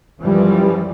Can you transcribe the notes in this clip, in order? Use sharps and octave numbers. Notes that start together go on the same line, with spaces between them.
F#2 E3 F3 G3